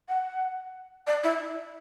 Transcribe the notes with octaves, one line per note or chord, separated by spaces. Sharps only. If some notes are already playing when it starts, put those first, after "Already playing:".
F#5
D5
E4